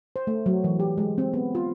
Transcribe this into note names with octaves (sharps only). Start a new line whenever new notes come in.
C5
A3
F#3
E3
G4
G#3
C4
B3
F4